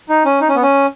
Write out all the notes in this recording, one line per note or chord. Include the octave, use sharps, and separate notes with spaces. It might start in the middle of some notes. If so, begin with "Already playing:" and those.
D#4
C#4
D#4
C#4
B3
C#4